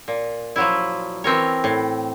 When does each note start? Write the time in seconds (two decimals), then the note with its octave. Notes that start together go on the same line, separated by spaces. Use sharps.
0.08 A#2
0.56 F3 F#3 E4
1.24 E3 C4 A#4 C#5
1.64 A2